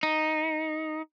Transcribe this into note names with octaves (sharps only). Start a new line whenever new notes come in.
D#4